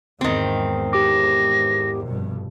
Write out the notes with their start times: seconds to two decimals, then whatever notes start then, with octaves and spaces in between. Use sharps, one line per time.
0.21 E2 G#2 D#3 C4
0.93 G4 D6 A#6
2.05 F1 G2 B2